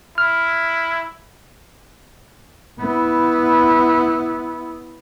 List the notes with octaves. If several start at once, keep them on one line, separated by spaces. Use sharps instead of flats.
E4 F6
B3 E4